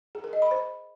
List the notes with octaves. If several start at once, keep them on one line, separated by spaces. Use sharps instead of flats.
G#4
A#4
D#5
B5
C5